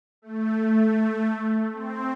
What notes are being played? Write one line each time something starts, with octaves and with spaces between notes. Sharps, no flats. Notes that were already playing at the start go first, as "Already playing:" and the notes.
A3
C4